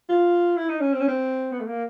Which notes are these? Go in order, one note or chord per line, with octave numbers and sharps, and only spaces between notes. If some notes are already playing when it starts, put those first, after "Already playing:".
F4
E4
D#4
C#4
C4
C#4
C4
B3
A3
A#3